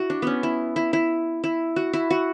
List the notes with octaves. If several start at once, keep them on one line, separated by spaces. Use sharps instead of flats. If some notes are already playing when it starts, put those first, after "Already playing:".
Already playing: E4 F#4
D4
B3 C#4
E4
E4
E4
E4
F#4
E4
F#4